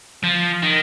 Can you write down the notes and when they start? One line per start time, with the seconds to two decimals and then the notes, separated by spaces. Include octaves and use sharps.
0.24 F3
0.63 D#3